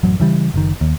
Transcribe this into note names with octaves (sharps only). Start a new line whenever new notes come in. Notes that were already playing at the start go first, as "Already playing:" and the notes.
A1 F#2 F#3
C#3 E3 G3
F#1 D#3
D#2